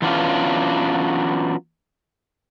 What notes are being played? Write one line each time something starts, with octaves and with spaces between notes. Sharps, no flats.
E3 F#3 B3 C#4 D4 F4